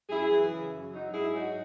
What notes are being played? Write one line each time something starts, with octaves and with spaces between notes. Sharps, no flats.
F#2 E4 G#4
E3
C#3
F#2
F#3 D#4 F#4
G#2 E4 G#4
F#3 D#4 F#4